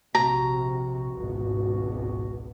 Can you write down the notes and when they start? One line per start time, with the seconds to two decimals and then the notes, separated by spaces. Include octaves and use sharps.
0.15 A#1 C3 F#4 A#5
1.15 G#1 C#2 B2